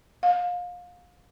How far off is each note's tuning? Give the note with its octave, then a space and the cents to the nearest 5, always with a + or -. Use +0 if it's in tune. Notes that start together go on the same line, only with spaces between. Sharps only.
F5 +30